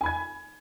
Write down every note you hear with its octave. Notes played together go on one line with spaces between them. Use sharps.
G#5 B5 G#6